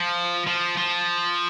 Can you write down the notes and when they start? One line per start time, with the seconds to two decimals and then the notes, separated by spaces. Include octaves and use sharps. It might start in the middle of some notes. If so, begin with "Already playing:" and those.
Already playing: F3
0.47 F3
0.77 F3